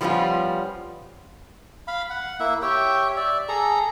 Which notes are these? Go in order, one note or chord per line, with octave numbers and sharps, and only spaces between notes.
F3 G3 B3 C#4 F4
F5 B5
F#5
A#3 E4 E5
G4 C#5 E5 G5
D5 E5
G#4 A4 A#5